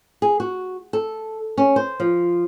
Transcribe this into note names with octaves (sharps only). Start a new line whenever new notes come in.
G#4
F#4
A4
C#4
C5
F3